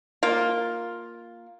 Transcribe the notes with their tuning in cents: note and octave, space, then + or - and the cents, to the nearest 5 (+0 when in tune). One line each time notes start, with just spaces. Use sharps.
A#3 +0 F4 +5